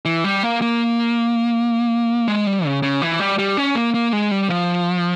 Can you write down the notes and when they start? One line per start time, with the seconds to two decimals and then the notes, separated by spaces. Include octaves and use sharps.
0.05 E3
0.24 G3
0.43 A#3
0.62 A#3
2.28 G#3
2.47 G3
2.65 C#3
2.83 C#3
3.02 E3
3.20 G3
3.38 G3
3.57 C#4
3.75 A#3
3.94 A#3
4.13 G#3
4.31 G3
4.49 F3